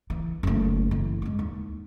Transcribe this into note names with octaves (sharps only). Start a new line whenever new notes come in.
E3
F#1 A3
E3
G3 G#3
D#2